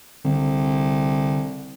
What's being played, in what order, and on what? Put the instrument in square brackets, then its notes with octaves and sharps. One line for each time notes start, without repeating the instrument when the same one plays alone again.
[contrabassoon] C2 [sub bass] D3